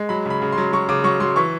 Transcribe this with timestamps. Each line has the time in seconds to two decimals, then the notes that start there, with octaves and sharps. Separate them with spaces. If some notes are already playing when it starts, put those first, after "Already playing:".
Already playing: G#3
0.09 F#3 B5
0.26 C#3 B5
0.42 C#3
0.52 C6
0.58 F#3
0.73 F#3 C#6
0.89 C#3 D6
1.04 F#3 C#6
1.20 F#3 C6
1.36 E3 C#6